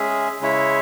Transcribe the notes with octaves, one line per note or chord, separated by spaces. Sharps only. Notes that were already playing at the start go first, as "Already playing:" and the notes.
Already playing: G#3 C#4 G#4 E5
C#3 G#3 E4 C#5 E5